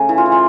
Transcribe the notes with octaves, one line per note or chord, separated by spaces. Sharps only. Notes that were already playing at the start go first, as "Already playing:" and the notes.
Already playing: C#3 A3
E3
F4
E3
F4